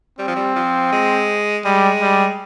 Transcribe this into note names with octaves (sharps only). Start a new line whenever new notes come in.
G3 C4
F3
G3
F3
G#3
G3 G#3
G3